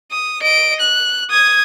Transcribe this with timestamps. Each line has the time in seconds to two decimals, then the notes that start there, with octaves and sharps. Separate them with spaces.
0.11 D#6
0.42 D#5 D7
0.80 F#6
1.30 D#6 G#6